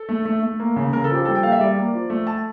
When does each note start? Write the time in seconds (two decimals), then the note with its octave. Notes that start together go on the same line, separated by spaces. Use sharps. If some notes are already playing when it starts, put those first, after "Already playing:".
Already playing: A4
0.09 A3
0.25 A3
0.43 A3
0.60 A#3
0.76 C#3
0.92 C#3 A#4
1.04 A4
1.10 F3 G4
1.25 G3 A4
1.35 G5
1.43 A#3 F5
1.52 E5
1.60 G3 D5
1.77 A#3
1.94 F3
2.10 A3
2.27 A5